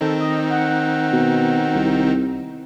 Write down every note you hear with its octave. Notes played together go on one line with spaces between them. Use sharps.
D#3 C4 D#4 A4
D#5
F#5
B2
C2